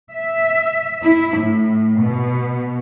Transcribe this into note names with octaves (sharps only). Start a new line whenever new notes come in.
E5
E4
A2
B2